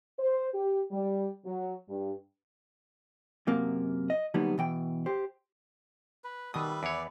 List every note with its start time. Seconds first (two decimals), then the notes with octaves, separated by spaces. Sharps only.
0.19 C5
0.54 G4
0.92 G3
1.46 F#3
1.89 G2
3.47 F#2 C3 A#3
4.10 D#5
4.34 D3 F#3 G3 A#3 B3 D#4
4.58 B2 E3 G5
5.06 G4 C5
6.24 B4
6.54 B2 D#3 G3 B4 E5 D#6
6.83 E2 C#5 D5